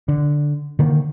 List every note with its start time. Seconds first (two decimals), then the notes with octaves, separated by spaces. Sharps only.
0.08 D3
0.79 D3 D#3 A#3